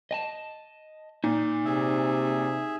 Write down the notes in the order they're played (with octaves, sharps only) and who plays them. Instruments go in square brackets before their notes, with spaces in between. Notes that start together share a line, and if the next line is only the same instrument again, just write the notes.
[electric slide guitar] D#5 G#5 A5
[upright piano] A#2 [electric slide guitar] D#4
[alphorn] C3 [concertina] G#4 E5